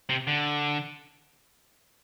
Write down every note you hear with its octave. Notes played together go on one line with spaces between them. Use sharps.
C3
D3